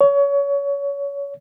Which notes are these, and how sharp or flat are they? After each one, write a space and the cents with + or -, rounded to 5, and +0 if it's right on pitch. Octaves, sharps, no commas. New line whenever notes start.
C#5 +25